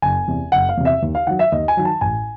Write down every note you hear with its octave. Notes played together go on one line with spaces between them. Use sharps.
F#1 G#5
E2 C3
F#1 F#5
F5
E2 C3
E5
D#2
F5
D#3 F#3 F#5
E5
D#2 D#5
G#5
D#3 F#3
A5
A1 G#5